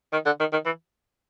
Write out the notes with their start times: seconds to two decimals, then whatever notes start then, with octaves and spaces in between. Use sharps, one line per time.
0.13 D#3
0.26 D3
0.40 D#3
0.53 D#3
0.66 E3